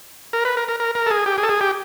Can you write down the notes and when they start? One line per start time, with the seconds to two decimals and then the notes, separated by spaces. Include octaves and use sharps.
0.33 A#4
0.45 B4
0.57 A#4
0.68 A#4
0.80 A#4
0.95 A#4
1.07 A4
1.11 G#4
1.26 G4
1.38 G#4
1.43 A4
1.49 G#4
1.61 G4